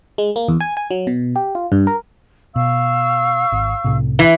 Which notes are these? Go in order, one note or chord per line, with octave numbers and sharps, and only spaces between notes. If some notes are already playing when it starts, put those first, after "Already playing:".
G#3
A#3
E2
G#5
G#5
F#3
B2
G4
F4
G2
A#4
B2 F5 C#6 E6
G#1
C2 A2 C3
E3